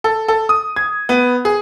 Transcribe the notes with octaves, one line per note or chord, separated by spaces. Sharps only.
A4
A4
D#6
G#6
B3
G#4